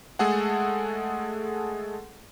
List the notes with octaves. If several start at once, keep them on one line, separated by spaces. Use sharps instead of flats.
G#3 A3 G#4 A4 F#5